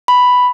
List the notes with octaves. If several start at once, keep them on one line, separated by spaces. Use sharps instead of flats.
B5